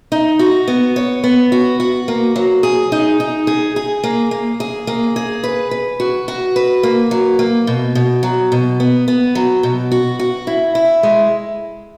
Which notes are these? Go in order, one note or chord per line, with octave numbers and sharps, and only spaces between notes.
D#4
F#4
B3
C#5
B3
F#4
F#4
A#3
F#3
G#4
D#4
D#4
G#4
G#4
A#3
A#3
G#4
A#3
G#4
B4
B4
F#4
F#4
B4
A#3
F#3
A#3
B2
B2
F#3
B2
B3
B3
F#3
B2
F#4
F#4
E4
E4
G#3